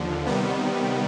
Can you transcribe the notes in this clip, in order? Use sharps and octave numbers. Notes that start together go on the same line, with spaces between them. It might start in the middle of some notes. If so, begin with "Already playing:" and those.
Already playing: D#2 D3 F3
C3 D#3 G3 B3